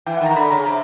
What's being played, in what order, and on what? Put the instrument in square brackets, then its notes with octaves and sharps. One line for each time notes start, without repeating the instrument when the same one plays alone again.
[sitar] E3 [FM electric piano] G5
[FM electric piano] F#5
[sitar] D#3
[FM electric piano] A#5
[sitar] D3 [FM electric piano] B5
[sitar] C#3 [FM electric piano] A#5
[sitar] C3 [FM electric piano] A#5